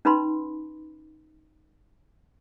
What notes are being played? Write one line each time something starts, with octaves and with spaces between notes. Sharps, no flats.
C#4 D#4 B4 A5 B5 C6